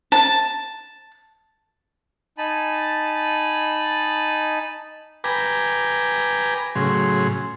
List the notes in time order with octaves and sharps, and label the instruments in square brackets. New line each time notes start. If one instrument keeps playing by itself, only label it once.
[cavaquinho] A5
[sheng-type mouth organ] D#4 G#5 A5 B5
[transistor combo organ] B4 G5 G#5 A#5 D6
A2 C#3 F#3 G#4 C6